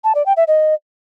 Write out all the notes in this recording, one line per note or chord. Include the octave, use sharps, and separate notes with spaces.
A5
D5
G5
E5
D#5